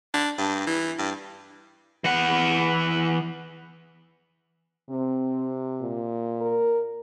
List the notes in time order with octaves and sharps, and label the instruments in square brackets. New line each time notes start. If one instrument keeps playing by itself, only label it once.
[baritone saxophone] D4
G2
E3
G2
[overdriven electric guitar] E3 F#5
[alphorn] C3 [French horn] C4
[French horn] A#2
[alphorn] A#4